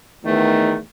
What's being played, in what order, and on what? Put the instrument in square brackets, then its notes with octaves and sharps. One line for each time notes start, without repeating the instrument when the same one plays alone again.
[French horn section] E2 D#3 [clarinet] A3